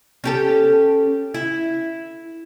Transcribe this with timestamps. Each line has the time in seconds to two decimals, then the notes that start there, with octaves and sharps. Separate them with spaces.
0.24 C#4 G4 A4
1.34 E4